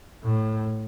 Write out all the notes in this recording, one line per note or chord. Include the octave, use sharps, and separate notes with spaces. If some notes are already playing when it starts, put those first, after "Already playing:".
A2